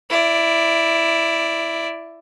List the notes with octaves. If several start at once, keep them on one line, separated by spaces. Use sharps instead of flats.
E4 D5